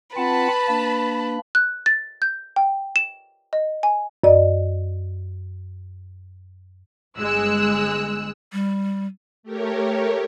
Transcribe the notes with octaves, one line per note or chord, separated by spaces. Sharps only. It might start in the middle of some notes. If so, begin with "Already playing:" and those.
C4 F4 B4 F#5 A5 B5
A#3 D4
F#6
A6
G6
G5
E7
D#5
G#5
F#2 D5 D#5
G1 G#3 E6 F#6
G3
A3 G4 A#4 C#5